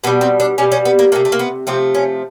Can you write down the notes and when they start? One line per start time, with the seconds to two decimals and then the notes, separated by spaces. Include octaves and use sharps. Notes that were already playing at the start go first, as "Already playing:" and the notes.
0.04 B2 B3
0.07 G3
0.21 C4
0.40 D4
0.58 B2 G3 C#4
0.72 C#4
0.85 B3
0.99 A#3
1.12 C3 F3 A3 A#3
1.25 A3
1.32 A#3
1.39 B3
1.67 C3 F3 A3 C4
1.95 C#4